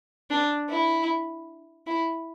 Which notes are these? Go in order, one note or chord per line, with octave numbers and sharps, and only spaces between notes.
D4
E4
E4